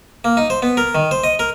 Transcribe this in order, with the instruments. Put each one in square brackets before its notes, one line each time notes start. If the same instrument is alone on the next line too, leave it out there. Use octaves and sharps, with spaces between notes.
[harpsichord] A#3
D#4
C5
B3
A#4
D#3
C5
D#5
A#4